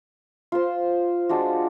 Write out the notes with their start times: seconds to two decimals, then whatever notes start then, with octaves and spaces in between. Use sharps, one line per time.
0.52 F4 C5
1.29 G#3 D4 F4 F#4